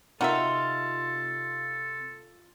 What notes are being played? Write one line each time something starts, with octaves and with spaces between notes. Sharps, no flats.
C3 D#4 F4 F#4 A4 A#4 E5